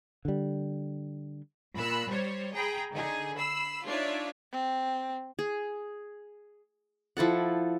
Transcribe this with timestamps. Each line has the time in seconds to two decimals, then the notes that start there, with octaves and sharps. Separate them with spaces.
0.25 D3 G3
1.75 A#2 B5 E6 F#6
2.10 G3 C5 C#5
2.53 G#4 G5 A#5 B5
2.94 D3 D#4 G#4
3.36 B5 E6 C7
3.85 D4 D#4 F4 C#5 D5 E5
4.52 C4
5.39 G#4
7.17 F3 E4 A4 F#5